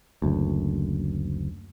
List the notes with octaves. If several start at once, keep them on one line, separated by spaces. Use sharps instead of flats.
F#1 D2